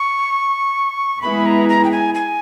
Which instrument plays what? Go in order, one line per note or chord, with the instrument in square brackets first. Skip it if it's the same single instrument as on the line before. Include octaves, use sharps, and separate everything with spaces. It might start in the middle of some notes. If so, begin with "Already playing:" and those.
Already playing: [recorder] C#6
[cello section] G#3 B3 E4 G#4 B4 [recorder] B5
[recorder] A#5
A#5
G5
G#5
G#5